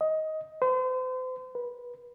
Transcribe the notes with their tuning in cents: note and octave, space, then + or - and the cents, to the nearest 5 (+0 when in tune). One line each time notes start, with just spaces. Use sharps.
D#5 +15
C5 -40
B4 -25